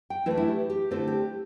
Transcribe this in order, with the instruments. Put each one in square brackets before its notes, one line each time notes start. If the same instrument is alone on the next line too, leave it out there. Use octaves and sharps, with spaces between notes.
[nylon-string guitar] G5
E3 A3 D4 E4
E4
G4
G4
D3 A3 C4 E4 A4
G4